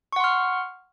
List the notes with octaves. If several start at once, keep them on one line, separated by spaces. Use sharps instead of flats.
F#5 C6 C#6 F6